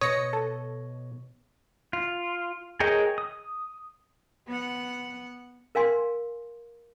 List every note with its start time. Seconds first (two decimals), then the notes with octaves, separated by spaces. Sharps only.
0.01 B2 C#5 D#5 D#6 A#6 C#7
0.33 A4
1.93 F4
2.80 G#4 A#4 C#5 D#5 G5
3.18 D#6
4.48 B3 F#5
5.75 A#4 F5 G#5 C6